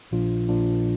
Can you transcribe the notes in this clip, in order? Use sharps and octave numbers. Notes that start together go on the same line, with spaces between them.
A#1 A#2 F3 D4 F4
A#1 A#2 F3 D4 F4